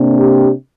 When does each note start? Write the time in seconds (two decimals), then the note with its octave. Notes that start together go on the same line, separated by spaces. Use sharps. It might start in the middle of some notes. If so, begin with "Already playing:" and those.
Already playing: C3 A#3 D4
0.17 G4